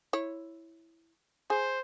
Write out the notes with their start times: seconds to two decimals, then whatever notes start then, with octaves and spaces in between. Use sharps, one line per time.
0.13 E4 C#5
1.50 G#4 C5